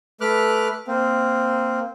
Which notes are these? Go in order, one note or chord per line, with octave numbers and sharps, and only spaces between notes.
A3 B4 D6 F6 F#6
A#3 C4